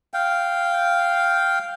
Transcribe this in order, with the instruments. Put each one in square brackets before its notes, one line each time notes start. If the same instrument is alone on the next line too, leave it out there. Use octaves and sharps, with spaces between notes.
[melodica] F5 G5